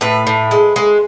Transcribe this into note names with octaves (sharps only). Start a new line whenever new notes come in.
A2 B4
A2
G#3
G#3